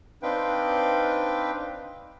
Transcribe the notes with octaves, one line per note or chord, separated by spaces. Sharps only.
C4 D4 D#4 B4 F5 G5